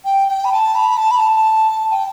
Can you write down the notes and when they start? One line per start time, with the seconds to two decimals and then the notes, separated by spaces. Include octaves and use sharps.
0.05 G5
0.28 G5
0.45 B5
0.52 A5
0.75 B5
0.97 A5
1.11 B5
1.21 A5
1.91 G5